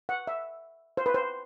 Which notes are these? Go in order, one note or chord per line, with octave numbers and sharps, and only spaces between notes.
F#5
E5
C5
B4
C5